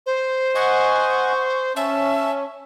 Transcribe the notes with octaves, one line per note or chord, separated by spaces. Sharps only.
C5
D#5 F#5 G#5 C#6
C#4 E5 A5